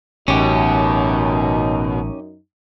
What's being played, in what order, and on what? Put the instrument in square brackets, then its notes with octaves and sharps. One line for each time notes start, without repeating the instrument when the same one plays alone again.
[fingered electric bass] A1 [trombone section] F#2 D#4 [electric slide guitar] B2 [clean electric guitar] C#4 G4